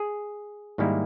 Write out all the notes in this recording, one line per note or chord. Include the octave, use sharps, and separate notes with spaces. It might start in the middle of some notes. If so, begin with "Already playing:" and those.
Already playing: G#4
G#2 D#3 G3 A#3 E4